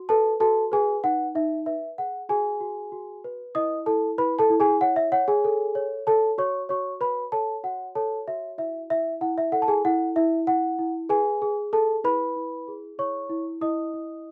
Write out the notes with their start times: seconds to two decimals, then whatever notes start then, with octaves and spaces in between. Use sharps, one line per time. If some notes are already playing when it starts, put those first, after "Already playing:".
Already playing: F#4
0.09 A4 B4 A5
0.40 F#4 A4 A5
0.72 G#4 B4 G#5
1.04 D#4 F#5
1.35 D#4 E5
1.66 B4 E5
1.98 G#4 F#5
2.29 F#4 G#4 G#5
2.61 F#4
2.92 F#4
3.24 B4
3.55 E4 D#5 D#6
3.86 E4 A4 A5
4.18 E4 B4 B5
4.39 A4 A5
4.50 E4
4.60 G#4 G#5
4.81 C#5 F#5
4.96 E5
5.12 C#5 F#5
5.28 G#4 G#5
5.44 A4
5.75 C#5
6.06 A4 C#5 A5
6.38 F#4 C#5 C#6
6.69 F#4 C#5 C#6
7.01 B4 C#5 B5
7.32 A4 C#5 A5
7.64 F#4 F#5
7.95 A4 C#5 A5
8.28 F#4 E5
8.58 E4 E5
8.90 E4 E5
9.21 E4 F#5
9.38 E5
9.52 A4 F#5
9.62 A5
9.68 G#4 G#5
9.85 E4 F#5
10.16 E4 E5
10.47 E4 F#5
10.79 E4
11.09 G#4 B4 G#5
11.42 G#4
11.73 G#4 A4 A5
12.04 E4 B4 B5
12.36 E4
12.68 G#4
12.98 E4 C#5 C#6
13.30 E4
13.61 E4 D#5 D#6
13.94 E4